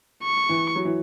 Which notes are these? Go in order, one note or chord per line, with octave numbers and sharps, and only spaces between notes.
C#6
E3
F#3
E3